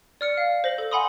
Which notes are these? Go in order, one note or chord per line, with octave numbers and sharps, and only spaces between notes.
D5 F6 C#7
F5
C5 A#6 F#7
A4
F#5 G#5 B5 C6 D#6